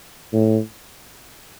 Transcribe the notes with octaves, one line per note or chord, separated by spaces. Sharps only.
A2